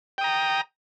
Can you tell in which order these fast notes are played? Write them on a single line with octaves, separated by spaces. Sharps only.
G5 D#6 A#5